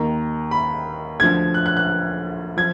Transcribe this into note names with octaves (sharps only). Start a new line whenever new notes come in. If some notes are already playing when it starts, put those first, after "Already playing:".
Already playing: D#2 D#3 A#5
B5
D2 D3 F3 G#6
F#6
F#6
F#6
F3 G#6